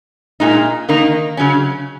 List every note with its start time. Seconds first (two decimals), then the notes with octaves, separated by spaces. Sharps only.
0.40 A#2 G#3 D#4
0.89 D#3 A#3 D#4
1.37 C#3 F#3 C#4